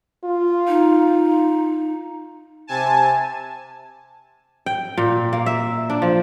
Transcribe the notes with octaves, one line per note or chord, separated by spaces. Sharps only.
F4
D#4
C3 G#5 A5
G5
A#2
A#3
E5
D4
F3